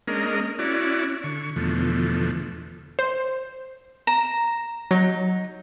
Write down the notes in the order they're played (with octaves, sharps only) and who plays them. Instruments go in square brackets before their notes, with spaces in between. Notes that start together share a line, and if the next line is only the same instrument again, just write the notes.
[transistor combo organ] G#3 A#3 C#4 D4 A#4 D#5
C#4 E4 F#4 D5
D3 C#6
E2 B2 D3 F3 A3
[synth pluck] C5
[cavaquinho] A#5 [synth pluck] E7
[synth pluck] F#3 [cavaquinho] D#4